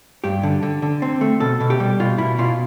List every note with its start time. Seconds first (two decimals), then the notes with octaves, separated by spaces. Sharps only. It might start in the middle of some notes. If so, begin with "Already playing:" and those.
0.24 G2 G4
0.43 D3
0.63 D3
0.82 D3
1.02 C4
1.21 A3
1.40 B2 A4
1.60 B2
1.70 G4
1.80 G3
2.00 B2 F4
2.18 B2 E4
2.38 B2 F4